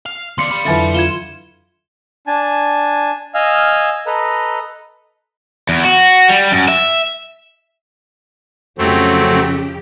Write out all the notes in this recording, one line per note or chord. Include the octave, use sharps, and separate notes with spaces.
F5
D#2 D4 F5 C6 C#7
D5 B5
F2 D3 E3 F#3 E5
F4 G#6 E7 G7
D4 G#5 A5
D#5 F5 G#5 E6 F6
A4 B4 D#5 A#5
E2
F#4
G3
F#2
E5
F2 C#3 F#3 A3 C4 G4